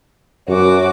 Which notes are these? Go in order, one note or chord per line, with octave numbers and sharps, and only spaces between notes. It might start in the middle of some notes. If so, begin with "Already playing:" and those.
F#2 F#4 D6